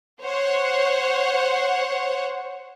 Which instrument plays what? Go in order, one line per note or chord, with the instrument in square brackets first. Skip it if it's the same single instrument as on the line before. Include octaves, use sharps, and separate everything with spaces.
[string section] C5 C#5 F#5